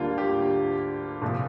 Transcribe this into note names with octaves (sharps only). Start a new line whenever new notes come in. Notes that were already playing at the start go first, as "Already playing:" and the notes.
Already playing: D2 D3 G3 A#3 F4
G4
C2 A#2 F3